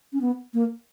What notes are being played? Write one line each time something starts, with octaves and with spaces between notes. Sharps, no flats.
C#4
B3
A#3